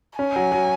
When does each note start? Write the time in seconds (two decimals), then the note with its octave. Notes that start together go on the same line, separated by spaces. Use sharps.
0.19 C#4 G#5
0.36 F#3
0.52 F#3